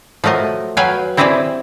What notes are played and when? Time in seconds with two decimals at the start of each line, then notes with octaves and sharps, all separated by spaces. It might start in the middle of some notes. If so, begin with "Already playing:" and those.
0.24 F3 F#3 A3 A#4 D#5
0.77 F#3 B4 F5 G5 G#5
1.17 C4 E4 G4 G#4 D5 E5